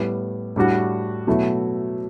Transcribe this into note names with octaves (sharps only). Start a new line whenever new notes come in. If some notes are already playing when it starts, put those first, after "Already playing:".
Already playing: A2 G3 B3
A2 G3 D4 F#4
B2 F#3 A3 E4